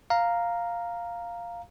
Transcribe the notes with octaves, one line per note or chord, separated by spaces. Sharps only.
F5 A#5